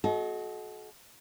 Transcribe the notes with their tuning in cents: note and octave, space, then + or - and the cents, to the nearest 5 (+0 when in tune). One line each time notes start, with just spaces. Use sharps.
F#4 +0 A4 -40 D#5 +20